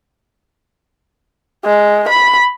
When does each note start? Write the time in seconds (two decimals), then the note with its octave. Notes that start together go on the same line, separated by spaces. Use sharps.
1.65 G#3
2.08 B5